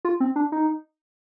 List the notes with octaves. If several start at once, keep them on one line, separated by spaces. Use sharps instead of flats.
F4
C4
D4
D#4